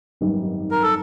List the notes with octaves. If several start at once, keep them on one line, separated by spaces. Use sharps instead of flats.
G#1 F#2 D#3 G3 B3
A#4
A4